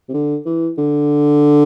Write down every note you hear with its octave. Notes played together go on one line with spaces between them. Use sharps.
C3
D3
E3
D3